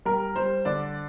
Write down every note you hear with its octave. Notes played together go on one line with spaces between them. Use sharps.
G3 A#4
G3 C5
D3 D5